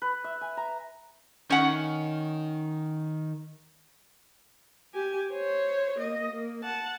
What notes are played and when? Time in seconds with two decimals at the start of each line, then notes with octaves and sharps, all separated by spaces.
0.02 B4
0.24 E5
0.41 G#5
0.57 A#5
1.50 D#3 C#4 F#5
4.94 G4 G#5
5.32 C5 C#5
5.98 A#3 D#5
6.32 A#3
6.64 F#5 A5